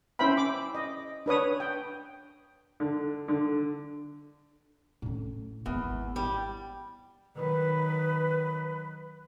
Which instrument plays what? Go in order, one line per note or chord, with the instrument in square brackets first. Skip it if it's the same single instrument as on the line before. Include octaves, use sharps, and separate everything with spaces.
[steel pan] C#4 E4 C5 E5 G5 B5
D6
D#5
D4 B4 C#5 D#6
G5
[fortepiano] D3
D3
[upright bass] A2 C#4
[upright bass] G#1 A#3 [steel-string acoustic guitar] E2
[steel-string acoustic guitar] G3
[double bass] D#3 F#3 [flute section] B4